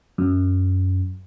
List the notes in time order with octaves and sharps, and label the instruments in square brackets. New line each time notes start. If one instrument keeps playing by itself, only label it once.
[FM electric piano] F#2